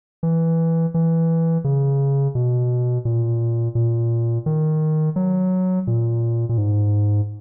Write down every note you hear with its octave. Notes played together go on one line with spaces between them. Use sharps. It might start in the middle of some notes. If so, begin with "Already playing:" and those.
E3
E3
C#3
B2
A#2
A#2
D#3
F#3
A#2
A#2
G#2